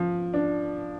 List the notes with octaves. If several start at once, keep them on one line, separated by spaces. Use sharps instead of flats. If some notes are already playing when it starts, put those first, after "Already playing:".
Already playing: F3
D4